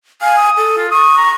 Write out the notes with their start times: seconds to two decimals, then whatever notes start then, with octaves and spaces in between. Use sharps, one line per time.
0.22 F5 G#5
0.37 D#6
0.57 A4
0.77 F4
0.91 C#6 D#6
1.18 A#5